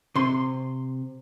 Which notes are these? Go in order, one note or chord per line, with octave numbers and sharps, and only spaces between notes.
C3 C6